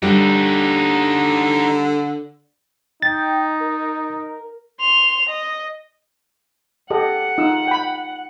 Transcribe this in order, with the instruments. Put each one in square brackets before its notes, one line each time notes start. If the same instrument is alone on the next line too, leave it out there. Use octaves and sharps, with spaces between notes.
[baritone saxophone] D3 [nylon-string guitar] G3 [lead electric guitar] D#4 G4
[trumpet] D#4 [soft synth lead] G5 [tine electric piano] A6
[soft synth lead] A#4
[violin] C6 F7
D#5
[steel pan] G4 A4 D#5 [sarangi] F#5
[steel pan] D#4 F4 E6
G5 B5